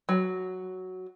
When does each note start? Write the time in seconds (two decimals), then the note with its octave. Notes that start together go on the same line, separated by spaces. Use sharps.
0.09 F#3